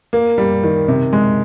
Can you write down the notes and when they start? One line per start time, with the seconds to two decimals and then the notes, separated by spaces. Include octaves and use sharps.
0.13 A#3
0.38 G3
0.63 D#3
0.88 C3
1.13 G#3